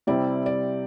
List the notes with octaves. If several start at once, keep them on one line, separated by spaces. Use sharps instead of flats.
C3 G3 C4 E4 D5
D5